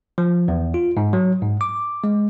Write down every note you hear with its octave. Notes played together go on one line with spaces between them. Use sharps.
F3
E2
F4
G#2
F#3
G#2
D6
G#3